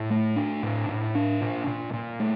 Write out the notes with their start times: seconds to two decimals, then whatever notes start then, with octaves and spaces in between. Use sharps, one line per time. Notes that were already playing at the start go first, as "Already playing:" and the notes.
Already playing: A2
0.10 A3
0.36 D4
0.63 A2
0.89 A2
1.15 D4
1.41 A#2
1.67 A#2
1.93 A#2
2.20 A3